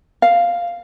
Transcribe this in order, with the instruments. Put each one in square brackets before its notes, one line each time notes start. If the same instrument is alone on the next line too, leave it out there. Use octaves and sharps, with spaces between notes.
[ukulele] F5